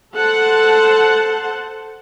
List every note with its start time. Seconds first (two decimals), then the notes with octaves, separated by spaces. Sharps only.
0.14 A4 C5 F#5 A5